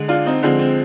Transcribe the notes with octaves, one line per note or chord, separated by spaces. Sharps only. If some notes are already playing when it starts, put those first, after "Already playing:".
Already playing: D3 G#3
D4 F4
C4 D#4
D3 F3 G#3 C4
C4